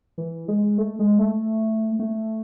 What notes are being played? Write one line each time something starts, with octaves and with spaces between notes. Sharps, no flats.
E3
G#3
A3
G#3
A3
A3